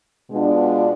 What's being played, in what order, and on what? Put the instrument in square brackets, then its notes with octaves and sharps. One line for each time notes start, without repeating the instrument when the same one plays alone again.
[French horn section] B2 G#3 B3 D4 F4